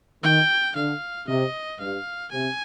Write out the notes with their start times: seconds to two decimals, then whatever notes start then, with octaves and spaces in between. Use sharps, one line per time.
0.23 D#3 G5
0.76 D3 F5
1.28 C3 D#5
1.80 G2 F5
2.32 C3 G#5